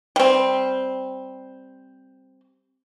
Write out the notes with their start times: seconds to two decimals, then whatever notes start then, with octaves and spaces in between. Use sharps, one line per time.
0.16 G3 C4